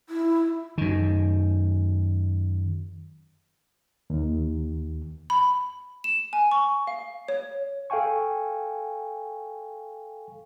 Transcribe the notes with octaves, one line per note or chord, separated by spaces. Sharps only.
E4
F#2 D#3
D#2
B5
E7
G#5
C#6
F5
C#5
A4 F5 G5 G#5 C#6